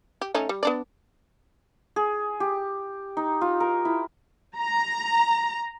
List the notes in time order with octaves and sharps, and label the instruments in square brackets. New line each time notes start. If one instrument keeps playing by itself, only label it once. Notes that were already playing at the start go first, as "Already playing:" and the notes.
[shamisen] G4
A3 C#4 D#4
G3
B3 D4 D5
[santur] G#4
G4
D#4
F4
A#4
E4
[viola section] A#5